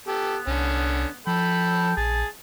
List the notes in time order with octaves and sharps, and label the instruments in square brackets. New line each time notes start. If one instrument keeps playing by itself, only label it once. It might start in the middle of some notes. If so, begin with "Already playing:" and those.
[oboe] B3 [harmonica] G4 A4
[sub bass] C2 [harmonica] D3 C#4
[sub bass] F3 [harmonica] A4 B5 [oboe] G5
[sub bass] A#1 [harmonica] G#4 [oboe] A5